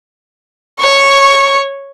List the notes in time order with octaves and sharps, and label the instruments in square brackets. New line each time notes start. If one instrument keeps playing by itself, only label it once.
[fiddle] C#5 [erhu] C#6